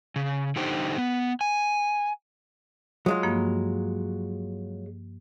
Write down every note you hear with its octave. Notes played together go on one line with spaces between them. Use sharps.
C#3
D3 D#4 G4 C5
B3
G#5
F#3 G#3 F4 D#6
G2 F3 A#3